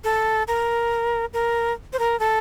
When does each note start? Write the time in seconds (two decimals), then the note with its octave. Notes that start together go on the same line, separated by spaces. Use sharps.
0.04 A4
0.48 A#4
1.33 A#4
1.93 C5
1.99 A#4
2.20 A4